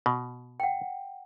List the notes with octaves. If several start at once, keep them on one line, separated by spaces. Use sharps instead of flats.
B2
F#5 G5